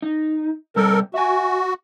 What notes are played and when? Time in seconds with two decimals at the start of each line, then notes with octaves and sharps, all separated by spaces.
0.02 D#4
0.76 B2 G3 A4 A#4
1.14 F#4 E5 G#5